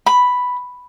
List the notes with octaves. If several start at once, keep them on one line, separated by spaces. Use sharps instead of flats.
B5